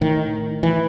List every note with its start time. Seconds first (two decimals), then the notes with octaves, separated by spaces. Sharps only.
0.01 A2 D#3
0.63 E3